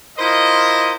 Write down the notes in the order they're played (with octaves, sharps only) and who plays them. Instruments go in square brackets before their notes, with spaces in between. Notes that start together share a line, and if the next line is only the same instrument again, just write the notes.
[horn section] E4 F4 A#4 C5 D#5